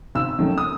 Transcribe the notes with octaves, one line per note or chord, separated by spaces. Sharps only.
G#1 E6
F#2 D#3 F#3 A3
D#6